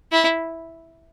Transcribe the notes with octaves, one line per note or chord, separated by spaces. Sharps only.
E4